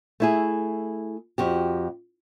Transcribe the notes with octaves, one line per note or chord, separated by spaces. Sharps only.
A3 E4 G#4
F2 F#4 G4